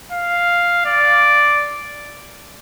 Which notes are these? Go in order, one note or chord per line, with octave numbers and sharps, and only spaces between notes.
F5
D5